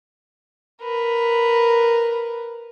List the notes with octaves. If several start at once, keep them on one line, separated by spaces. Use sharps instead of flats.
A#4 B4